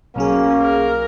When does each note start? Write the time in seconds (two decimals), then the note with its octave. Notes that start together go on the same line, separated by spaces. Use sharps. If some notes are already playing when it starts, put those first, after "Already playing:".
0.16 B1 F#3 A#3 C#4 G#4
0.62 A#4